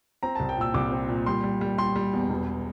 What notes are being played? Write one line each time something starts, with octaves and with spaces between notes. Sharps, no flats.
C4 A#5
C2 A5
G5
A#2 E6
C2 D6
C4
A#2
G3 C6
G3
G3
G3 C6
G3
E2
E1